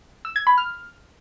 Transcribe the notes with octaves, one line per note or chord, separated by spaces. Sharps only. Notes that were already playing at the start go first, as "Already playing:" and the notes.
E6
G#6
B5
F6